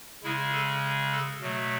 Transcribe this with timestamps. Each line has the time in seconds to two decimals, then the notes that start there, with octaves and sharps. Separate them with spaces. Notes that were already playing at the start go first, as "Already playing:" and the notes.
0.23 C#3 G#3 E4
0.52 A4
1.13 A4
1.41 B2 F#3 A3